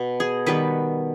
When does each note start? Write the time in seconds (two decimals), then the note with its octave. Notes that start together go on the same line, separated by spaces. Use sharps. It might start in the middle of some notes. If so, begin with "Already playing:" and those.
Already playing: B2 B3
0.20 G#4
0.46 D#3 G3 B3 B4